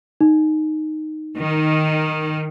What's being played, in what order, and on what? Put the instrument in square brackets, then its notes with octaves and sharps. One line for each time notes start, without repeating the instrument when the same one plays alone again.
[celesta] D#4
[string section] D#3